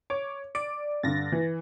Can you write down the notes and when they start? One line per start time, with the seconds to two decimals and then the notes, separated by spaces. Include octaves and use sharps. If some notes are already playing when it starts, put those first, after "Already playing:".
0.10 C#5 D6
0.55 D5 D7
1.03 G2 D3 A6 A#6
1.32 E3